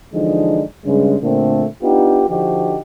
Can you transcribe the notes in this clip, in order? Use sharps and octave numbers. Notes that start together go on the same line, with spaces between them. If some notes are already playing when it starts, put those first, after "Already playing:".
D3 E3 F3 G#3 D4 D#4
G2 C#3 G#3
A#2 D3 A3 A#3 C4
B3 D4 D#4 F4 G4
D3 F3 D4 D#4 F#4 G4